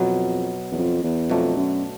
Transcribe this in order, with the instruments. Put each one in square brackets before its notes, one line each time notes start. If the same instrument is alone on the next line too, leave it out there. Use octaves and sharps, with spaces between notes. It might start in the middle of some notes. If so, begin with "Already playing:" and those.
Already playing: [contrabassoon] F2 [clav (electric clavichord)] B2 F#3 B3
[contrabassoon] E2
F2
E2
[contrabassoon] F2 [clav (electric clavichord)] B2 F#3 A3 D4
[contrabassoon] F#2